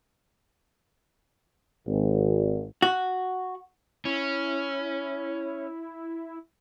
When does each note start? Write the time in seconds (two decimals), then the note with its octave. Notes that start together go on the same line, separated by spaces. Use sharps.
1.87 G#1
2.82 F#4
4.05 C#4 E4